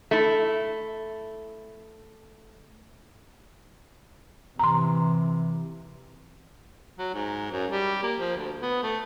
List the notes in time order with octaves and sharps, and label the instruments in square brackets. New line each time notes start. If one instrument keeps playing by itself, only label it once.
[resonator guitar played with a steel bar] A3 E4
[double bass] C3 E3 [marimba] A#5 C6
[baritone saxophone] F#3
G#2
F#2
G3
A#3
F3
D2
B3
A3